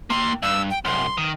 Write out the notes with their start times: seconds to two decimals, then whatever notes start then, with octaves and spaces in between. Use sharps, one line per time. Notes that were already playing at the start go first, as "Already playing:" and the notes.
0.10 A#3 G5 C6
0.43 G2 E6
0.71 G5
0.85 C2 F#2 C6
1.18 D#3